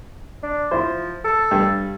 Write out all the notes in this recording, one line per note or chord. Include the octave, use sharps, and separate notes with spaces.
D4
F3 E4 C5
A4
G2